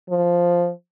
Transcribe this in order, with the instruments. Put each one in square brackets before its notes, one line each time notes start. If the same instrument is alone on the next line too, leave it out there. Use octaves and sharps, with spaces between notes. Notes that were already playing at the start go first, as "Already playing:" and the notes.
[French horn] F3